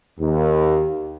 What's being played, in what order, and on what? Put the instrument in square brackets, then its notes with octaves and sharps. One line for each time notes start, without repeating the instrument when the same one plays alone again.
[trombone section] D#2